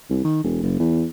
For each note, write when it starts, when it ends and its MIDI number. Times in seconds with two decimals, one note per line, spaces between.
0.10 0.20 36
0.24 0.42 51
0.43 0.60 28
0.63 0.78 30
0.79 1.06 40